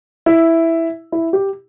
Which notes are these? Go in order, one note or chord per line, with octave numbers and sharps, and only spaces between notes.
E4
E4
G4